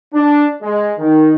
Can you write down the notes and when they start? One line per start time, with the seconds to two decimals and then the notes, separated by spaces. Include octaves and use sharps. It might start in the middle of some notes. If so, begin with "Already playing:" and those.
0.14 D4
0.62 G#3
0.98 D#3